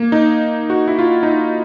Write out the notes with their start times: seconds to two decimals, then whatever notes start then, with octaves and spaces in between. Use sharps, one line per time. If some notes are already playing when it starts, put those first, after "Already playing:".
Already playing: A#3
0.12 D#4
0.70 F#4
0.88 E4
0.99 F4
1.23 D#4
1.28 E4